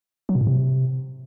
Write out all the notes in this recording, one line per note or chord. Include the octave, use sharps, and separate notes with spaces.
F#3
B2
A2
C3